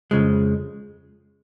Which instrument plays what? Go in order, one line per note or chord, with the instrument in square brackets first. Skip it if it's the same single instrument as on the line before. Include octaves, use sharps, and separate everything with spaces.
[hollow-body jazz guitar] F2 C#3 F3 G#3